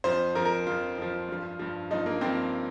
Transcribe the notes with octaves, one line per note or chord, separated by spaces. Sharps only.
F2 F3 C5
F2 F3 A#4
A#4
F2 F3 F4
F2 F3
G2 F3
G2 F3
G2 F3 D#4
A#3
G2 F3 C4